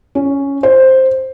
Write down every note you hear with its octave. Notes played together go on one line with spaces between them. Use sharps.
C#4
C5